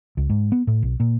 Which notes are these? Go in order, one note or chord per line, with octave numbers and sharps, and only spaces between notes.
C#2
G#2
B3
A2
B1
A#2